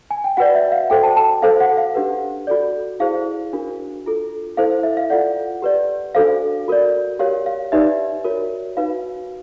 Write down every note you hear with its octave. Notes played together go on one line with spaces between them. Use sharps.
G#5
G5
F#4 B4 D5 F#5
E5
F5
F#4 A4 C5 G5
A5
A5
F#4 A4 C5 F5
F#5
F5
D4 G4 B4
F#4 A4 D5
E4 G#4 C5 F5
D4 F#4 A#4
D4 F4 A4
E4 A4 C5 F5
F5
E5
F5
F4 A4 D5 F#5
G4 B4 D5
D4 F#4 A4 C5 F5
F#4 A#4 D5
G4 A#4 C#5 F5
F5
D#4 G4 B4 D5 E5
F#4 A#4 C#5
D#4 F#4 B4 F5